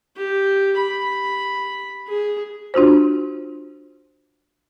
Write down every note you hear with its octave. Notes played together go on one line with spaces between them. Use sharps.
G4
B5
G#4
D4 F4 F#4 C5